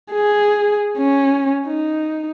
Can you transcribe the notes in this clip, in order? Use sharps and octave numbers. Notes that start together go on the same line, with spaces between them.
G#4
C#4
D#4